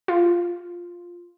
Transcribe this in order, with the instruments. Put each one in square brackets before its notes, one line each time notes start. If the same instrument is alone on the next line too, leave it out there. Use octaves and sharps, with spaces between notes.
[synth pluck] F4